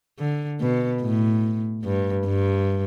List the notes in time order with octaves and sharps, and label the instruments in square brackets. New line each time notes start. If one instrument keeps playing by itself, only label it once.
[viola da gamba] D3
B2
A2
G2
G2